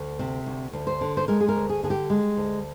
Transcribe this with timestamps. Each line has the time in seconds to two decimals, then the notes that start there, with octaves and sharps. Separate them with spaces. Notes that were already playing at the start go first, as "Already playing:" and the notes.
Already playing: D2
0.19 C3
0.46 D2
0.73 D2
0.87 C5
1.01 D3
1.17 C5
1.28 G#3 A#4
1.40 G#4
1.49 A#4
1.55 D2
1.69 G#4
1.83 D3 G#4
1.90 G4
2.10 G#3
2.37 D2